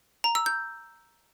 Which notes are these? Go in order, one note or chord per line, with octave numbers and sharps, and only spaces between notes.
A#5
E6
G6